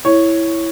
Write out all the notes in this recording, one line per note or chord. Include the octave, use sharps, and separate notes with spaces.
E4 C#5